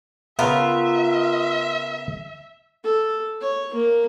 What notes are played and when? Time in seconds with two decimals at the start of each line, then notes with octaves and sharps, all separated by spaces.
0.39 C#3 B3 F4 A#4 E5
2.84 A4
3.41 C#5
3.74 A#3